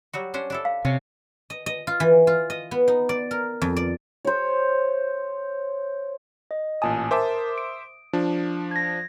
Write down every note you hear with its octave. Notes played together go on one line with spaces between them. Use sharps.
F#3 G3 F#4
C#4 D4 C5
D4 E4 A4
F5
C3 C#4
D#5
D#5
F4
E3
F4
D#5
B3
D#4
D5
A#4
F2
D5
C5 C#5
D#5
A1 A#2 G#5 A5 D#6
A#4 C5 E5 A5 D6
D7
F3 D4
G#6 A#6